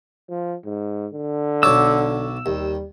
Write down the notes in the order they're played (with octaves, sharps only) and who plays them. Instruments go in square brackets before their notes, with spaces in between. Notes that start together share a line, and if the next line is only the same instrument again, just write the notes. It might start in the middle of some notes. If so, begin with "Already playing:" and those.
[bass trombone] F3
G#2
D3
[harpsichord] B1 C#5 D5 [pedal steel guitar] E6
[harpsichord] D#2 [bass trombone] G3